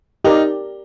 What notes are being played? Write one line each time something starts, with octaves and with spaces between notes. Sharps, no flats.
D#4 G4 A#4 D5